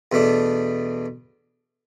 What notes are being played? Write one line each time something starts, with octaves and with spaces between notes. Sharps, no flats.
E2 B2 A3 D4